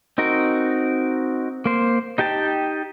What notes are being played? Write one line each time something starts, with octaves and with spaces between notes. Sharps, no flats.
C4 D#4 F#4 A#4
A#3 C5
D#4 G4 G5 A5